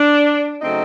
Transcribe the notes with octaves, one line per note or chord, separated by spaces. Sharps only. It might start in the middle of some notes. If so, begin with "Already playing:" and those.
Already playing: D4
C#3 F#3 A3 C4 D#4